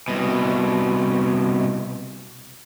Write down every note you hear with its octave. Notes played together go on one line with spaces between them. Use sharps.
C2 B2